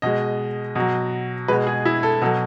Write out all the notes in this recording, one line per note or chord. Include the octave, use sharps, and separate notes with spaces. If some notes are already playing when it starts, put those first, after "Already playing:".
B2 G#3 D#5
B2 F#3
B2 G#3 B4
G#4
E4
A4
B2 F#3 A4